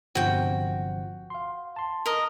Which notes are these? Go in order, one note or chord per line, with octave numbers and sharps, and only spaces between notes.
G1 C3 F3 F#4 G5
F5 C6
A5 C6
A#4 D#5